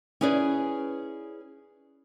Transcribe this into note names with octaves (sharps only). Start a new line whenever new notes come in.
C#4 E4 G#4 B4 D5